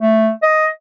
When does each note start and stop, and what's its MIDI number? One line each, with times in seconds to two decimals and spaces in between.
0.01 0.30 57
0.43 0.66 75